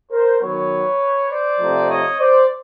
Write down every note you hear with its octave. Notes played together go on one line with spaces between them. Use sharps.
A#4 C5
D#3 F#3 B3 B4 C#5
C5 D5
C3 F3 A3 C4 D#4
C#5 D#5
C5 D5